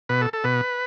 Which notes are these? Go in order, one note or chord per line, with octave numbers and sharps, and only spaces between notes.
B2 B4
A4
A4
B2 B4